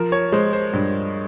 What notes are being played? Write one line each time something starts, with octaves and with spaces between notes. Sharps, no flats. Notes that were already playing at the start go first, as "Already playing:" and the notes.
Already playing: F3 A#4
C#5
G#3 C5
C5
G2